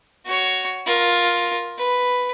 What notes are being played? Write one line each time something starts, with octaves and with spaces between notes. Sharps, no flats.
F#4 C#5
F4 A#4
B4